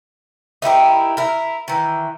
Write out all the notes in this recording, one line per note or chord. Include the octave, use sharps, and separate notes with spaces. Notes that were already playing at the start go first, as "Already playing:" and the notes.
D#4 E4 G4 A#4
E4 A#4
D#3 E3